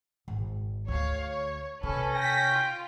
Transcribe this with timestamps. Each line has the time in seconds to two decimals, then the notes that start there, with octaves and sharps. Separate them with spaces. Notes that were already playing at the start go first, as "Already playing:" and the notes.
0.28 G#1
0.88 D2 C#5 F5
1.21 C#5
1.83 C3 C#4 A4 B4
2.15 G5 A#6 B6
2.52 F4